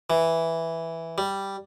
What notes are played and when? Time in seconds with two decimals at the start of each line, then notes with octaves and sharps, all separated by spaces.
0.10 E3
1.18 G3